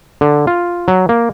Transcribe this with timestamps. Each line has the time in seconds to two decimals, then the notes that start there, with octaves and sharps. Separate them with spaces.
0.21 D3
0.47 F4
0.88 F#3
1.09 A#3